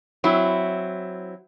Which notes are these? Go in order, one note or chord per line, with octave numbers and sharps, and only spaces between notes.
F#3 C4 E4